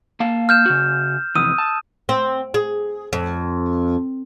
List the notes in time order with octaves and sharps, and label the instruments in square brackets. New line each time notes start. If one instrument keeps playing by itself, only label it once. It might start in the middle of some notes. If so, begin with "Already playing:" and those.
[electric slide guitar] A#3 F5 A5
[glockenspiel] F6 G6 E7
[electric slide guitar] C#3 F#4
[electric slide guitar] F2 C3 E3 [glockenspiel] D#6 E6 D#7
[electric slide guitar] A5
[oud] C4
G#4
F2